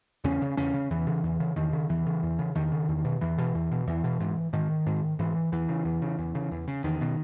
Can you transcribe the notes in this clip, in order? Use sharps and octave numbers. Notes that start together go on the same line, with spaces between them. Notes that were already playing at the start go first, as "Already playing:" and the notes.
E2 C#3 C#4
C#3
E2 C#3 C#4
C#3
E2 E3
C#3
E2
C#3
E2 D#3
C#3
E2 E3
C#3
E2
C#3
E2 D#3
C#3
E2
B2
E2 E3
B2
E2
B2
E2 E3
B2
G#2
G#2 D#3
G#2
G#2 E3
E2 E3
C#3
E2
C#3
E2
C#3
E2
C#3
E2 D#3
B2